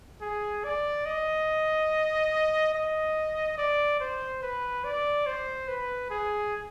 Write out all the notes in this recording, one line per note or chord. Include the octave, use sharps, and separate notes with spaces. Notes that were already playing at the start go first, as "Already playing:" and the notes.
G#4
D5
D#5
D#5
D5
C5
B4
D5
C5
B4
G#4